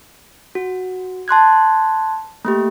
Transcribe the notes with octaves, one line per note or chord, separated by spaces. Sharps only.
F#4
A5 C6 F#6 G#6
A3 A#3 G4